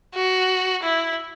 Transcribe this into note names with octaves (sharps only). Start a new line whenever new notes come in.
F#4
E4